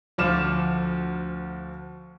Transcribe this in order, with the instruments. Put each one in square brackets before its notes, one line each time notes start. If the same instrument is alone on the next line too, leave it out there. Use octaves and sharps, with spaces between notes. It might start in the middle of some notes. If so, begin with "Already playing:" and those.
[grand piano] D2 F3 D6 F6 E7